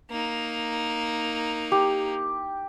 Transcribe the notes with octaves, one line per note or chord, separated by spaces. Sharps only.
A#3 D#4
G4